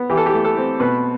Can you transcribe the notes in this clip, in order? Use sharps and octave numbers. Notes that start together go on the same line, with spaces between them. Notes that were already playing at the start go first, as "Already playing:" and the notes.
Already playing: B3
E3 G4
A4
G4
A3
A4
C4
B2 B4